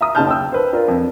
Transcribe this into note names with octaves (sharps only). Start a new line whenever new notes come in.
E5 A#5 D#6
F#1 C#3 D#4 A5 F6 G6
G5 E6
B4 C5
D4 F4 A#4
F2